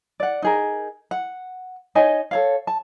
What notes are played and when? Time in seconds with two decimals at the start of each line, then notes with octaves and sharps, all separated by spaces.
0.20 D5 F#5
0.42 D#4 G#4 A#4
1.11 F#5
1.95 D#4 C#5 D#5 G#5
2.31 A4 C#5 F5
2.67 A5